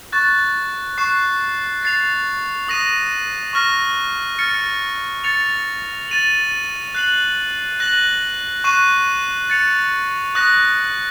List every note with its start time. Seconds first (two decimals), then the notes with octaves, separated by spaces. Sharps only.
0.12 C#6 F#6 A6
0.98 C#6 F#6 C7
1.83 A6 C7 F7
2.68 D#6 A#6 D#7
3.53 C#6 F6 A#6
4.39 F6 A6 C#7
5.24 A6 C#7 F7
6.08 A6 D#7 F#7
6.95 F#6 C7 F#7
7.80 F#6 A#6 D#7 F#7
8.64 C#6 F#6 C7 D#7
9.50 A6 C#7 F7
10.35 D#6 F#6 A#6